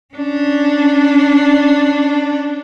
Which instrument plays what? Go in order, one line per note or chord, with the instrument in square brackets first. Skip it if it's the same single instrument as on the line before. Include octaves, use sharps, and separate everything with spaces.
[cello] C#4 D4